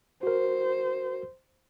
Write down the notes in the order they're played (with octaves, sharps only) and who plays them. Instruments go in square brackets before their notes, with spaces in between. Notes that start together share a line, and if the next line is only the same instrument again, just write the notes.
[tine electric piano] F#4 A#4 [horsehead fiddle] C5